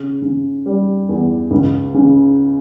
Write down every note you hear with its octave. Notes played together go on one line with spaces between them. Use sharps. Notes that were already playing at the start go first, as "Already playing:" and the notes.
Already playing: C#3
C#3
G3
E2
C#2
C#3